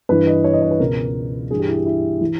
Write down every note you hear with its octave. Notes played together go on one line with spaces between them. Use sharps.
G2 E3 B4
D#5
C#5
D#5
C#5
B4
C#2 B2 A#4
G2 E3 G#4
G4
E4
G4
E4
E3